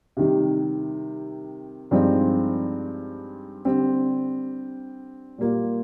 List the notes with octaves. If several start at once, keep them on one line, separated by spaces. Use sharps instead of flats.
C3 D#3 G3
G2 F3 G#3 C4 D#4
D3 G3 C4
A#2 G3 A#3 F4